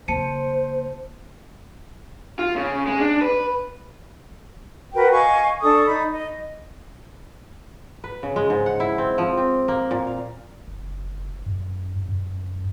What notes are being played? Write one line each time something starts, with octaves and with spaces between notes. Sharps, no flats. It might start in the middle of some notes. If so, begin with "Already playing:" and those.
C#3 A#3 C5 A5 C#7 D#7
F4
C#3
G#3
D4
B4
F#4 A#4 B4 G5
D#5 F5 G#5 C#6
D4 A4 C#6 D#6
D#4 B5
D#5
B4
C#3
G#3
G#2
F#5
E4
C4
F3
C4
A#3
A#2
F5
F#1
F#2
F#2